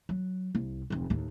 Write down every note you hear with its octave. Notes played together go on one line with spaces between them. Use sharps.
F#3
C2
F1 D2
D#2 A2